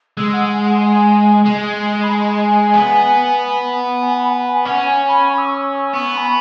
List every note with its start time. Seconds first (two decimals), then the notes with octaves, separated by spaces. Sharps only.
0.17 G#3 E6
0.33 F#5
0.49 G#5
0.65 F#5
0.80 G#5
1.45 G#3
2.03 B5
2.10 G#5
2.74 B3
4.02 G#5
4.17 B5
4.30 F#5
4.34 G#5
4.49 G#5
4.65 C#4 F#5
4.87 G#5
5.08 B5
5.30 C#6
5.38 E6
5.46 C#6
5.62 E6
5.94 B3 C#6
6.17 G#5
6.25 B5